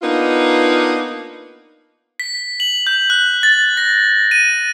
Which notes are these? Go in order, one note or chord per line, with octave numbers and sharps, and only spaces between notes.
A#3 B3 D4 D#4 F4
B6
F#7
G6
F#6
A6
A#6
D#7